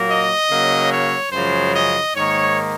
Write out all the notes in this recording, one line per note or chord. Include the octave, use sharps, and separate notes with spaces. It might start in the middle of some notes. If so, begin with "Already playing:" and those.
Already playing: A#2 F#3 A#3
D#5
C#3 F#3 A#3
C#5
F#2 C#3 F3 G#3 C5
D#5
G#2 D#3 A#3 C#5